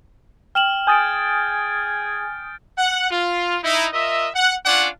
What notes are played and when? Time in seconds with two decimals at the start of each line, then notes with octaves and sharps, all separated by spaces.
0.55 G5 F6 E7 F#7
0.87 G#4 G#5 D#6 G6 A6 D7
2.77 F#5
3.10 F4
3.63 D#4 E4
3.93 F4 A#4 D#5 E5
4.34 F#5
4.65 C#4 D4 F4 C#5 D5 F#5